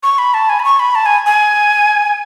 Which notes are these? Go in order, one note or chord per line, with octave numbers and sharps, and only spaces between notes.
C#6
B5
A5
G#5
B5
C#6
B5
A5
G#5
G#5